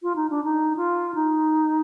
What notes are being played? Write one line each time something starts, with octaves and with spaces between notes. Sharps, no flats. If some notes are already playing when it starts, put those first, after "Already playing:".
F4
D#4
D4
D#4
F4
D#4